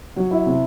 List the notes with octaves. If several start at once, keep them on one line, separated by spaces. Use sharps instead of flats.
F#3
E4
C3